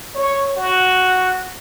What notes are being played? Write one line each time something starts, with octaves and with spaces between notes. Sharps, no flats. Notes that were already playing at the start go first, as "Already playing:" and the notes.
C#5
F#4